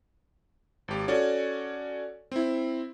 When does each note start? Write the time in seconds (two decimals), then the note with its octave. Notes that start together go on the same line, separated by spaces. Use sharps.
0.88 G#1 G4
1.08 C#4 F#4 A4 C#5 D5
2.32 C4 E4